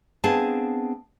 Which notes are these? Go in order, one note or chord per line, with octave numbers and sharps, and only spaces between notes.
B3 C4 D4 G#4 F5 A5